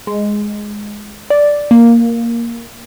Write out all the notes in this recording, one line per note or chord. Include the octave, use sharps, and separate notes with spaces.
G#3
D5
A#3